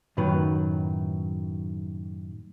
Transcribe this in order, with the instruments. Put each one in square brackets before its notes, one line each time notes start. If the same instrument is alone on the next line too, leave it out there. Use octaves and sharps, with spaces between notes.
[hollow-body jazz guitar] F#2 A2 D#3 F#3 B4